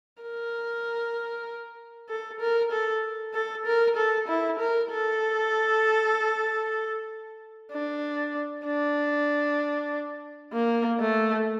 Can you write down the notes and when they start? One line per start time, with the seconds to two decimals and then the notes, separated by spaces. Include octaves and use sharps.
0.22 A#4
2.09 A4
2.40 A#4
2.72 A4
3.34 A4
3.66 A#4
3.96 A4
4.28 E4
4.59 A#4
4.91 A4
7.72 D4
8.65 D4
10.53 A#3
11.00 A3